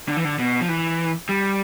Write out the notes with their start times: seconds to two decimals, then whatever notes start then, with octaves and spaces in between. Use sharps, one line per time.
0.09 D3
0.17 E3
0.24 D3
0.39 B2
0.61 F3
0.69 E3
1.29 G3